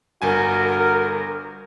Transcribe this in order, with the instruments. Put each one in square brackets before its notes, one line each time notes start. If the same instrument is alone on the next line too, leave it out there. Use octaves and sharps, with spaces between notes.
[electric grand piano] G1 G2 G#5 [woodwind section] F#4 A4 A#4